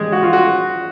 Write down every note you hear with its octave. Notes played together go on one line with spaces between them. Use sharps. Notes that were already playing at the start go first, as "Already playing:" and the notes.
Already playing: G#3 G4 G#4
F#4
F4
F#4